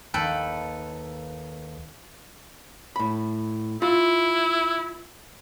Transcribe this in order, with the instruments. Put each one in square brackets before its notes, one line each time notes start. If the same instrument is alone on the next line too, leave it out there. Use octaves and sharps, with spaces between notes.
[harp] D#2 [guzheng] A4 B4 G5
[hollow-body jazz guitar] A2 B5
[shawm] E4 [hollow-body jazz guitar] F4